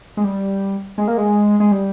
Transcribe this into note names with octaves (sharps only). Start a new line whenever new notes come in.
G#3
G3
G#3
A#3
G#3
G#3
G3